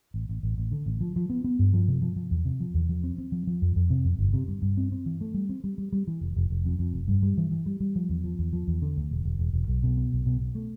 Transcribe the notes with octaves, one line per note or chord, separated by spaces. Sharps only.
A1
A1
A1
A1
D3
A1
F3
F3
B3
B3
G2
F3
C3
F3
F3
E2
C3
F3
E2
F3
C4
C4
F3
F3
F2
F2
C3
F2
G1
C3
G2
G2
C4
C4
E3
A3
G3
C4
G3
G3
G3
E3
F1
F1
F1
F2
F2
F1
G2
G3
E3
E3
G3
G3
F3
E2
F3
E2
F3
E2
D3
D2
E1
E1
E1
E1
B1
B2
B3
B1
B2
B2
A3